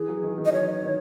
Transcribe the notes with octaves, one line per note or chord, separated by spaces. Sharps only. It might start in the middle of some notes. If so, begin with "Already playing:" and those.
Already playing: E3 G#4
F#3
D#3
D#3
D#5
F#3 C#5
E3
D#3